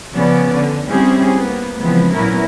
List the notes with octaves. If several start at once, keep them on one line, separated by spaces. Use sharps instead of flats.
C#3 F3 B3 C#4 D5
D3
G3 C4 C#4 E4 G4 G#4
A#3 B3
C#3 E3 F3 G#3 B3 C4
A#2 F#3 B3 C#4 E4 A#4